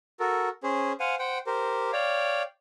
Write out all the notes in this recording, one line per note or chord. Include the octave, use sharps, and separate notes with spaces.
F#4 A4 A#4
C#4 G#4 C5
C5 F5 F#5 G#5
C5 F#5 G5
G4 A#4 C5
C#5 D5 F5 G5